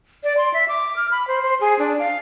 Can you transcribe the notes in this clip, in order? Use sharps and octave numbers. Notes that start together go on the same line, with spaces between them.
D5
C6
E5
D6
F6
B5
C5
C5
G#4
D4
F5